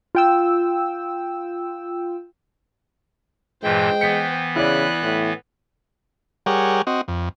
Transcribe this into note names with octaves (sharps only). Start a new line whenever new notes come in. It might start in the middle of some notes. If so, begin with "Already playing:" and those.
F4 G5 E6
G2 A#2 E3 G#3 C5 G5
E3 B3 B6 C#7
C#3 E4 D5 B5 F#6
A2
G3 G4 G#4 A#4 C#5 F#5
C4 F#4 D#5
F2